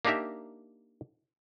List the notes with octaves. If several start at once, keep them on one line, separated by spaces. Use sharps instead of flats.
A#3 D4 D#4 G4 A#4 E5